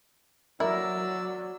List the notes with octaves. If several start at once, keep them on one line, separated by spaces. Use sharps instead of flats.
F#3 E4 A#4 D5 E6